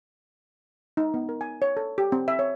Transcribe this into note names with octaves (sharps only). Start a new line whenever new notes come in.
D#4
B3
A#4
G#5
C#5
A4
G4
C4
E5
C#5